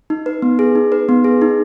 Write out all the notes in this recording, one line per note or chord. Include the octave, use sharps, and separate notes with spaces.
D#4
B4
B3
G#4
D#4
B4
B3
G#4
D#4